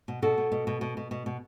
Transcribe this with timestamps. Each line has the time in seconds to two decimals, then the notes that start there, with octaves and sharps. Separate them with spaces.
0.08 B2
0.22 B2 F#4 A4
0.38 B2
0.52 B2
0.67 B2
0.81 B2
0.97 B2
1.11 B2
1.26 B2